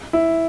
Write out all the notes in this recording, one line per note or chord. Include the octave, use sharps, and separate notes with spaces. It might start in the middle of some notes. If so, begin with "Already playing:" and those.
E4